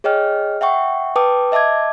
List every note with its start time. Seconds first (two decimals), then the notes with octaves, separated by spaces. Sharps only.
0.04 G#4 C#5 D#5 G5 F6
0.61 E5 F#5 G5 C#6
1.16 B4 G5 A5 D6 D#6
1.52 D#5 E5 A5 D6 G#6